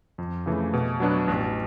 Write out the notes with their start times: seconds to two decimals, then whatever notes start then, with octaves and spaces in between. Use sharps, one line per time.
0.18 F2
0.46 C#3 E3 A3
0.73 B2
1.00 F#3 B3 D4 F#4
1.28 A1